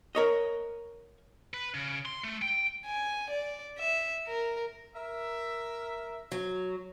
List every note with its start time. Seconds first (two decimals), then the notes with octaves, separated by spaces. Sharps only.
0.15 A#4 C#5 D#5
1.54 B4
1.74 C#3
2.05 C6
2.24 A3
2.42 G5
2.86 G#5
3.30 D5
3.79 E5
4.27 A#4
4.95 A#4 E5
6.32 F#3